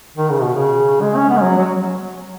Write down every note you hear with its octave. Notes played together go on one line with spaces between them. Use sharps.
D#3
C#3
B2
C#3
G#3
C#4
B3
G#3
F#3
F#3